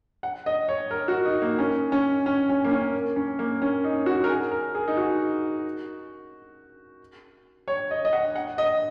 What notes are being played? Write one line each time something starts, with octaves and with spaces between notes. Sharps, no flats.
F#5
D#5
C#5
A#4
F#4
D#4
A#3
C#4
C#4
C#4
C#4
A#3
C#4
C#4
A#3
C#4
D#4
F#4
A#4
G#4
A#4
G#4
D#4
F#4
C#5
D#5
D#5
F#5
F#5
D#5